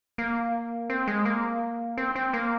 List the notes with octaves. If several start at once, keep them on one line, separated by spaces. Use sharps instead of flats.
A#3
C4
G#3
A#3
C4
C4
A#3